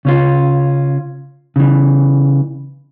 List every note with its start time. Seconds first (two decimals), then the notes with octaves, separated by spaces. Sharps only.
0.05 C#3 C#4 F4
1.56 C#3 E3